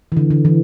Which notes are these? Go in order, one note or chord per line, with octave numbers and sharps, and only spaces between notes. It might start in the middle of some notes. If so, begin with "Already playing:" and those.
E3
D3
D3
E3